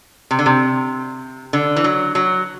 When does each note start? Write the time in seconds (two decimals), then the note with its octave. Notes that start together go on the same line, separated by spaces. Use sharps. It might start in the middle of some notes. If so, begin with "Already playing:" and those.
0.31 C3
0.39 D3
0.46 C3
1.53 D3
1.76 E3
1.84 F#3
2.15 F#3